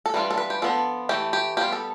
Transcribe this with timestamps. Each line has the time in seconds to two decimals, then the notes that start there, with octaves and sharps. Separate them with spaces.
0.06 A4
0.14 E3 G3 D4 F4 B4
0.31 A4
0.38 B4
0.50 G4
0.62 F3 B3 D4 A4
1.09 E3 A3 E4 G4
1.33 G4
1.57 G3 B3 F4 G4
1.72 A4